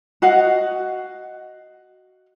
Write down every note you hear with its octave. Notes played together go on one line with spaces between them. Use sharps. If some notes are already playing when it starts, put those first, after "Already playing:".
F#4 D#5 F5 F#5